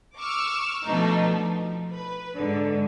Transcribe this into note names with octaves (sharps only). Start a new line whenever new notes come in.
C#6 D6 E6 F6
B2 F3 A3 D4 D#4
F3
B4
G#2 D3